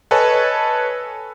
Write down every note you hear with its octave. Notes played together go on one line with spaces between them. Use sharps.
A4 B4 C#5 D#5 G#5 A5